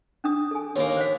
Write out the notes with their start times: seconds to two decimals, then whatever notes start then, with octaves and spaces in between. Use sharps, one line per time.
0.24 C#4 D4 D#6
0.51 A4 G#5
0.76 D#2 A#3
0.97 C5 C#5 F5